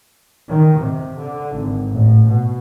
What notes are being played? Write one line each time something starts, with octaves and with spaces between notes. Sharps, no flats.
D#3
C3
D3
G#1
A1
B2